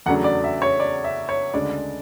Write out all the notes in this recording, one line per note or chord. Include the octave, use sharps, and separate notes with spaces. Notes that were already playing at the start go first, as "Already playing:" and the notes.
E2 C#3 F#3 A3 D4 F#5
D5
E5
C#5
D5
E5
C#5
D2 C#3 G#3 D4 D5